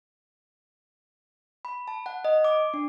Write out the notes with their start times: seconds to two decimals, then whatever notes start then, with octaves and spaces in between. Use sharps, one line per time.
1.65 B5
1.88 A5
2.06 F#5
2.25 D#5
2.44 D6
2.74 D4